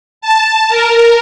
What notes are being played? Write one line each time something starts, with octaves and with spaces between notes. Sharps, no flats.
A5
A#4